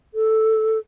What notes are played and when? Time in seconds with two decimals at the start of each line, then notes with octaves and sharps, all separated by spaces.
0.14 A4